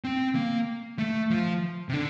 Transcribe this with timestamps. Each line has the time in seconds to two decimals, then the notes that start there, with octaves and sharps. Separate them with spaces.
0.04 C4
0.35 A#3
0.99 A3
1.30 F3
1.89 C3
1.93 D3